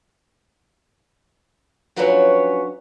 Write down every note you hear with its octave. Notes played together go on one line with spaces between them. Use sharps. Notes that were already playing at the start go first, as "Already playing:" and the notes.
F3 F#3 C#4 D4 B4 C#5